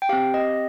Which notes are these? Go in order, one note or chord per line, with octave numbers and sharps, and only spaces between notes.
G5
C4 G4 F5
D#5